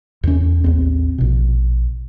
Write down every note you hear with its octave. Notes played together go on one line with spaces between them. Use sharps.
E2 C#4
A1 D#2 C4
A#1 B2